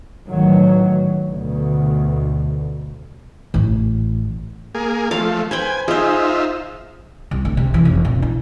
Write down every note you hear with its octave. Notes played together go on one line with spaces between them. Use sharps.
A1 D#3 F#3
D2 B2
A1 A3
A#3 G#4
F3 A3 F5
B4 C5 G5 G#5
D#4 F4 G#4 C5 E5
C2
D2
C3
E3
F1
A#2
E4